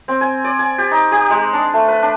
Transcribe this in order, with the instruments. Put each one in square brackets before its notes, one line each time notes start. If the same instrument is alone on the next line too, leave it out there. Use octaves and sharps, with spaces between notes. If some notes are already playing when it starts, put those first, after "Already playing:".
[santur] C4
G#5
D5
G#5
G4
D#4
G4
G#3
D4
A3
B4
D4